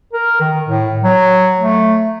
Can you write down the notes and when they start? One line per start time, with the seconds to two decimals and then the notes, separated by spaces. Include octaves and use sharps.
0.13 A#4
0.41 D#3
0.68 A2
1.04 F#3
1.59 A3